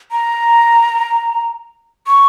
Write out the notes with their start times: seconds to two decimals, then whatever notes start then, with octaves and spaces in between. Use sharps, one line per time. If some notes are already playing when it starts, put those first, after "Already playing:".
0.12 A#5
2.07 C#6